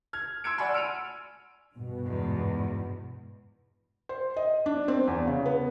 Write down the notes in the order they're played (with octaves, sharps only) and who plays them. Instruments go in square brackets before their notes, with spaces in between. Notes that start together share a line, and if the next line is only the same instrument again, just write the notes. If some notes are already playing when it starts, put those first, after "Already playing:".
[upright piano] F6 G#6
C6 E6 G#6 D7
D5 F#5 G#5 B5 C6
E6 F6 D7 D#7 F7
[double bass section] G2 B2
[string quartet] E2 G#2
[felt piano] C5
D#5
D4
C4
E2
C#3
B3